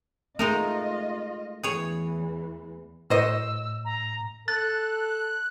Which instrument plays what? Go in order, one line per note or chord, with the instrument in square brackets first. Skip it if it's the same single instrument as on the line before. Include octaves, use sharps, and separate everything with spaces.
[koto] G#3 D#4 A#4 [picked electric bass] A3 [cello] F4 D#5
[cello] E2 E3 [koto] G#4 C#5
[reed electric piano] A2 [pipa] F#4 C5 D#5 [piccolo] E6
[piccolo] A#5
[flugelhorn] A4 [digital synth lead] F#6 [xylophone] A6